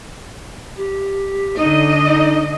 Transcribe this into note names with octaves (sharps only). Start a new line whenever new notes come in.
G4
D3 D#4 D#5
D#4